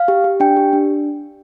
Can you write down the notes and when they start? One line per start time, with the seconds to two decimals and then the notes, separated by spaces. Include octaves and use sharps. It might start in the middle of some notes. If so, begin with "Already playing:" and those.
Already playing: F5
0.08 G4
0.24 G4
0.40 D4 G5
0.57 G4
0.73 D4